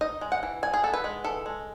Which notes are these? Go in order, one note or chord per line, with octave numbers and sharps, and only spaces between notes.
D#4 D#5
G#3
F#5
E3
G#3 G#5
G#4
B3 A4
B4
G#3
E3 A4
G#3